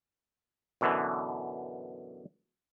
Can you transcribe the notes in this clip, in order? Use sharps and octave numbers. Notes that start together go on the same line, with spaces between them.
F#2 B2 D3 E3